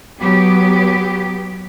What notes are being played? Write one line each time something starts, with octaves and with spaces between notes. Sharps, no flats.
F#3 B3 G4